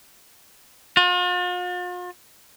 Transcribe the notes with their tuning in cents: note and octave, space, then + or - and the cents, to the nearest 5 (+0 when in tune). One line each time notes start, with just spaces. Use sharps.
F4 +45